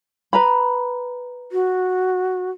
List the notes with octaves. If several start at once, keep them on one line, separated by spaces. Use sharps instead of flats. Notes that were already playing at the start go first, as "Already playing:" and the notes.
B4 A#5 B5
F#4